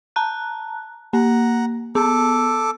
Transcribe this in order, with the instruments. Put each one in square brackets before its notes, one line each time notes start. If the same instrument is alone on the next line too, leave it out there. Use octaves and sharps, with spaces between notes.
[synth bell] A5 A#5 F#6
[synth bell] A#3 [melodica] F#5 A#5
[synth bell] B3 [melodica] A4 D6